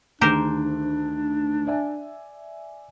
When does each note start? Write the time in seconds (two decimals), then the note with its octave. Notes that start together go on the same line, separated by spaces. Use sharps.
0.21 D2 D#3 D4 G4 G#4 A#4 C5
1.67 D5 E5 G#5